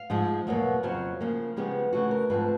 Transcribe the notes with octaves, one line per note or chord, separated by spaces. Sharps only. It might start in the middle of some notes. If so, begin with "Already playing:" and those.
Already playing: F5
G#2 F3 G#3
E2 B2 F#3 A#3
F2 C#3 F#3 C5
C#3 F3 A#3
C#3 F3 G#3 B3 G4
C#3 E3 A3 F#4
A#4
G#2 F3 A3 C4 B4